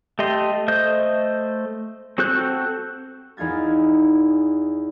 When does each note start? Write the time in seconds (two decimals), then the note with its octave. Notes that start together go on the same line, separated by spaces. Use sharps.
0.19 A3 G4 D#5 C6
0.68 A3 C5 D#5 G6
2.18 C4 F#4 A4 F#6 G6
3.37 E2 D#4 F4 G#6 A6